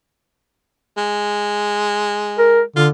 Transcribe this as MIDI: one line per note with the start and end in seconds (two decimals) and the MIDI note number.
0.97 2.63 56
2.38 2.61 70
2.76 2.89 50
2.76 2.87 65